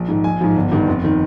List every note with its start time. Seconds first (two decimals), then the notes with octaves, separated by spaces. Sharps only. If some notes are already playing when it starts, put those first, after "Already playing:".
Already playing: A#1
0.08 G#2 D#3
0.24 A#1 G#5
0.41 G#2 F3
0.56 G1
0.72 G2 D#3
0.88 F1
1.04 D#3